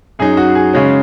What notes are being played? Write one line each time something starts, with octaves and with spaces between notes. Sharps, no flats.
F#2 F#3 D#4 G#4
F#4
G#4
C#3 G#3 C#4